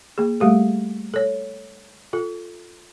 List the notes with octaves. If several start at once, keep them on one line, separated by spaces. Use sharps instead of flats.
A#3 G#4
G3 A3 G4 A4
A4 C#5
F4 A4